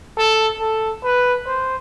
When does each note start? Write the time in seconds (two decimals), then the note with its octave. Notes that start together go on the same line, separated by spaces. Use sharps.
0.17 A4
0.60 A4
1.03 B4
1.46 C5